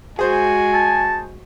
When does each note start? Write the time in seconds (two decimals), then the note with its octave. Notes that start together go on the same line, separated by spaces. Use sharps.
0.19 G#3 F#4 G#4 C5 G#5
0.74 A5